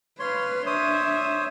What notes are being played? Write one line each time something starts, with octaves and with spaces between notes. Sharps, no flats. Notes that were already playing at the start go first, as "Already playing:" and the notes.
B4 C#5 F5 C6
D4 C5 C#5 E5 D#6